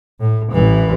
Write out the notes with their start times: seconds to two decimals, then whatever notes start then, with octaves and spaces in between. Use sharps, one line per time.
0.20 A2
0.52 A1 E3